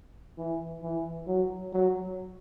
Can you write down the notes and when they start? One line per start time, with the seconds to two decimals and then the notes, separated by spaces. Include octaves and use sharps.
0.38 E3
0.83 E3
1.27 F#3
1.73 F#3